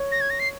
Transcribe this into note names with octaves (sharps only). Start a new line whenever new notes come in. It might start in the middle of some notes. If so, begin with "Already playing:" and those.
Already playing: C#5
A#6
G#6
A#6
C7